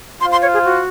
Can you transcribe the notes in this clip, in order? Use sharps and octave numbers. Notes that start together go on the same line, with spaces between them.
F4 C5 F5 C6
C6
C#5
G#4
F#4